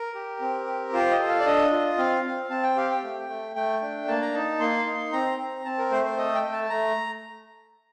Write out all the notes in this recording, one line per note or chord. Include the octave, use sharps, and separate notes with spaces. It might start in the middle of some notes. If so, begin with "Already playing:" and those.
Already playing: A#4
G4
C4
G4
F4 C5
D#5
A4
F5
D5
D4 D#5
F4
C4 F5
C4
C4 A5
G5
G4 F5
G5
A3
A3
A3 G5
D4
A#3 A5
A#5
D#4 A5
A#3 C6
D#4
C4 A#5
C4
C4 A5
A#4
A3 C5
C5
A4 D#5
G5
A3
A5
A3 A#5